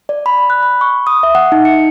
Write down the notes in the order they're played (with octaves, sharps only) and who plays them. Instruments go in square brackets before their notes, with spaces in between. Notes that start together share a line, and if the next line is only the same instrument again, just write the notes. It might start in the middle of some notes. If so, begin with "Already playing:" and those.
[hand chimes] D5
B5
F#6
B5
C#6
D#6
E5
F#5
D#4
C#7